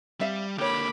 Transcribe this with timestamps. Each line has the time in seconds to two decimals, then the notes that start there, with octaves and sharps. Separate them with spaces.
0.20 G3 C4 E5 F5
0.58 D3 A#3 G4 C#5 B5 D6